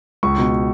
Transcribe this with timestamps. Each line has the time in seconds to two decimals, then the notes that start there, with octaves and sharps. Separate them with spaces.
0.23 C#2 C#6
0.38 B2